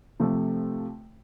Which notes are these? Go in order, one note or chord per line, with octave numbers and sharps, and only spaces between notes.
C3 F3 A3